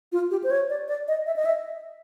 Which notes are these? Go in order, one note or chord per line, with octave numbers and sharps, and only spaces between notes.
F4
G4
C5
C#5
D5
D5
D#5
E5
D#5
E5